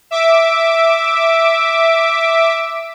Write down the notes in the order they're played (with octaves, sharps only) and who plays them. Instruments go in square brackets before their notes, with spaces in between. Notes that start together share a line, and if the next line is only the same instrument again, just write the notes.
[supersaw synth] E5 D6